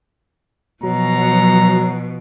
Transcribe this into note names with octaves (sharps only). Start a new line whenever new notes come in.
B2 F3 F#3 A#5